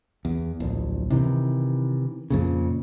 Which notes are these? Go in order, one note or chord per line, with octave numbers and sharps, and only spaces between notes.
E2
D1 A#1
C3 D#3 E3
F2 A#2 C#3